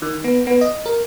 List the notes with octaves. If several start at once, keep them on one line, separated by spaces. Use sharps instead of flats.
D#3
B3
B3
D#5
A#4